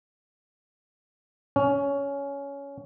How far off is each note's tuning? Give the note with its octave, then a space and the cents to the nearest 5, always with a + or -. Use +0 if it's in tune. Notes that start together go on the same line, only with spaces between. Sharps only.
C#4 +15